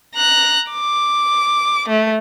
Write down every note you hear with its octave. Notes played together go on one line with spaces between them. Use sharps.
A#5 F#6
D6
A3